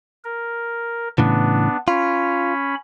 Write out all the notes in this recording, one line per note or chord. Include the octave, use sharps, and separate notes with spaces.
A#4
A2 C#3 E3 B3 D4
C#4 F4 B5